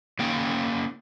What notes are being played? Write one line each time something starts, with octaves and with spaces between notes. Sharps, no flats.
C#3 A#3 G5